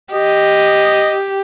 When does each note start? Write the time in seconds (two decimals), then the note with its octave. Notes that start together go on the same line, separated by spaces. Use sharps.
0.12 G4 D#5